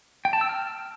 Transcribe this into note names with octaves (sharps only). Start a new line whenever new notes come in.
G5
A5
E6
F6